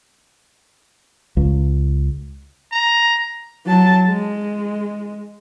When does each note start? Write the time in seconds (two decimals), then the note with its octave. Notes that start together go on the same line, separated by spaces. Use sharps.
1.37 C#2
2.72 A#5
3.67 F#3 A5
4.08 G#3